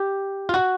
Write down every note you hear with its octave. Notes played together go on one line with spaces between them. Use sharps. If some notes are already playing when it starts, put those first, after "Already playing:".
Already playing: G4
F4
F#4